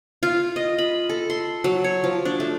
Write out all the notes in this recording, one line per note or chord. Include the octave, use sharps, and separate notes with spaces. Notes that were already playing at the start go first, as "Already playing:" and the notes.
F4
D#5
B5
A4
C6
F#3
C#5
F3
D4
A3